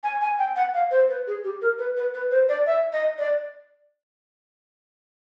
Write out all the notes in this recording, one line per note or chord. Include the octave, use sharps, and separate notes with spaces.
G#5
G#5
G5
F#5
F5
C5
B4
G#4
G4
A#4
B4
B4
B4
C5
D5
E5
D#5
D5